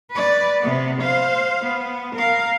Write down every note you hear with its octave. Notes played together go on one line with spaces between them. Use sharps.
B4 D5
C3 B3
C5 F5
B3
A#4 F5